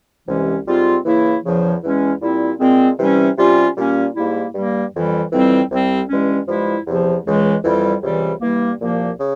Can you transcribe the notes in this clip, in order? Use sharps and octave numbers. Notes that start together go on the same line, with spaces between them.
C2 C3 E3 G#3 C#4
G#2 G3 C4 F4
C#3 E3 A#3 E4
E2 C#3 F3
E2 E3 G#3 C#4
A#2 G3 C4 E4
A#2 G#3 C4
C3 E3 G3 C#4
C3 G3 C#4 F4
A#2 G3 A#3 C#4
G#2 G3 A#3 E4
G2 G3 A#3
F2 E3 G3
F2 E3 G3 C4
C2 C3 G3 C4
G2 E3 G#3 C#4
G2 F3 G#3 E4
E2 C3 F3
C#2 C#3 E3 G#3
F2 E3 G3
C#2 C3 E3 G3
G2 E3 G3 A#3
C2 A#2 F3 A#3
C#3